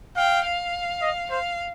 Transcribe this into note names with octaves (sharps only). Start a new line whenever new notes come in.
F5 G5
F5
D#5
C5 F5